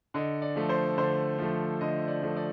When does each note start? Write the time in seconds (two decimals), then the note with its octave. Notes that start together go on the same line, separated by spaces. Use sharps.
0.14 D3 D#5
0.42 D5
0.56 F3 A3
0.69 C5
0.97 D3 C5
1.39 F3 A3
1.81 D3 D#5
2.08 D5
2.22 F3 A3
2.37 D5